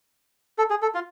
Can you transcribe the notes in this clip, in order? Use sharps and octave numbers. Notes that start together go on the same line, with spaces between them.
A4
G#4
A4
F4